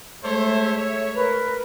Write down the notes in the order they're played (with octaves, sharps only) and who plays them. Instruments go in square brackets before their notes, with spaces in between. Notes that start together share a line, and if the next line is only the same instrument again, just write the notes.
[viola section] G#3 A3 E5 [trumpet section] A4 C5 C#5
[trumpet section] C#5
[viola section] A#4 [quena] B4